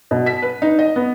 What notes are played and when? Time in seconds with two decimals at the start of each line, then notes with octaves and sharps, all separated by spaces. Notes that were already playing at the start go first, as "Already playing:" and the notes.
0.11 B2
0.26 B6
0.42 B4
0.62 D#4
0.79 D#5
0.96 B3